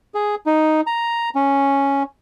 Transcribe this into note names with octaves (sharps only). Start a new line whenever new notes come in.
G#4
D#4
A#5
C#4